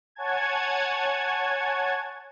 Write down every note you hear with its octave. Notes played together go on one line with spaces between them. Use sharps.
C#5 F#5 G#5 A5 G#6